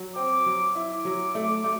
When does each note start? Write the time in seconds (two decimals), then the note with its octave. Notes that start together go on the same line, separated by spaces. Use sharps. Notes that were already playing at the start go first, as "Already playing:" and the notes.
Already playing: F#3
0.16 C4 D6
0.46 F#3
0.75 E4 D6
1.05 F#3
1.35 A3
1.64 A3